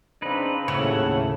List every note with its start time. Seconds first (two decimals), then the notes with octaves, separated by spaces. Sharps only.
0.22 C#3 C4 D4 D#4 B4
0.68 D#2 A2 C#3 A3 C#5 E5 F#5